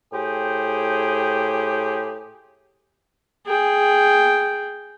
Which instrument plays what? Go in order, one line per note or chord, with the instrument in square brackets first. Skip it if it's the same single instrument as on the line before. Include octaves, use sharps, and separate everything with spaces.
[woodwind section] A2 G4 G#4 C5 G5
[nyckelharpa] G#4 G5